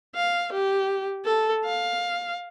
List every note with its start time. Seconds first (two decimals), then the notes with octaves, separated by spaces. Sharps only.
0.15 F5
0.52 G4
1.25 A4
1.65 F5